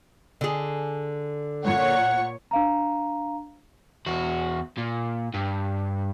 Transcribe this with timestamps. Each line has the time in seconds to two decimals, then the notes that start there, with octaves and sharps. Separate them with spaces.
0.41 D3 G#4
1.65 A#2 C#5 F#5 C#6
2.51 D4 F5 A#5
4.06 E2 F#4
4.78 A#2
5.34 G2